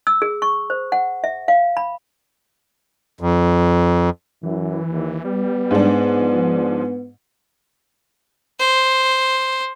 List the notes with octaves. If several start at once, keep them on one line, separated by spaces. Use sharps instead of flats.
E6
G#4
C#6
C5
F#5
E5
F5
B5
F2
F#2 E3
D#2
G3 B3
G#2 D4
F3
C5